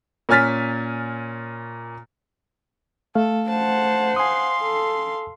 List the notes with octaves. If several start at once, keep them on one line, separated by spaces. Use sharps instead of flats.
A#2 C#4 G#5 F6 A6 B6
A3 A4 F5
C5 F#5 A5
F5 G#5 C6 D#6
A4